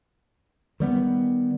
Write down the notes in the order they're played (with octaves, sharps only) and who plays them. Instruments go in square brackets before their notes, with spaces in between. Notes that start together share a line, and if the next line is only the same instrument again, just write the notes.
[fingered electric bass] D#3 G3 B3